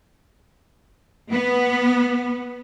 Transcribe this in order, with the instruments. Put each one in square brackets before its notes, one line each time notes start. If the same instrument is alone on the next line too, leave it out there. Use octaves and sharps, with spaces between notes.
[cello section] B3